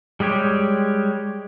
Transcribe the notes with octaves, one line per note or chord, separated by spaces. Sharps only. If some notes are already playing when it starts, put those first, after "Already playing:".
G3 G#3 G4 C#5